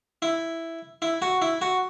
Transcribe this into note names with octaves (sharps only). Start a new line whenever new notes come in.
E4
E4
F#4
E4
F#4